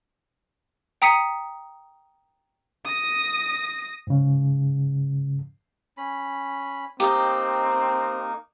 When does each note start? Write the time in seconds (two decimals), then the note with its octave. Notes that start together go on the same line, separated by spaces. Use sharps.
1.02 G5 A#5 D#6 B6 C#7 D#7
2.85 D#6 A#6
4.07 G#2 C#3
5.97 C#4 B5
7.00 A#3 C4 D#4 G4 D#5